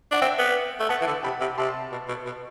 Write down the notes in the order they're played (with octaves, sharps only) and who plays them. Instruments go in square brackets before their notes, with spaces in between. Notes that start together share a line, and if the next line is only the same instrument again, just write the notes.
[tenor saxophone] D4 [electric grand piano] F#5
[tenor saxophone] C4 [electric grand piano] E5 G5
[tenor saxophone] B3
A3
[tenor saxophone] B3 [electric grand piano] F#5 A5
[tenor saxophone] E3
D3
[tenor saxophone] C3 [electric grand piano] G5 B5
[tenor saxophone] C3
[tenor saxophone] C3 [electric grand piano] A5 C6
[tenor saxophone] B2
B2
B2